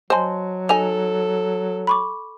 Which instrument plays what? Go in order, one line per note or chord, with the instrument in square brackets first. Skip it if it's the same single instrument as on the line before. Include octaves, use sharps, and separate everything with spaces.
[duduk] F#3 [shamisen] C5 G#5 [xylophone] D#5 A5 C6
[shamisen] D#4 D#5 G#5 [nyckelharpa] A4 [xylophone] F7
[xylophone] B5 C#6 D6